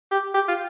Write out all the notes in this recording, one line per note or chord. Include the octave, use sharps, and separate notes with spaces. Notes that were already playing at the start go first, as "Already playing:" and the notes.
G4
G4
F4